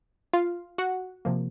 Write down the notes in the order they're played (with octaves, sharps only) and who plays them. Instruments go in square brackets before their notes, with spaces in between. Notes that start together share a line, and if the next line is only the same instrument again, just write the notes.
[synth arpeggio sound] F4 F5
F#4 F#5
C3 F3 A#3